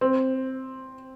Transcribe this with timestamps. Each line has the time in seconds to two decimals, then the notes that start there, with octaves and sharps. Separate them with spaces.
0.01 C4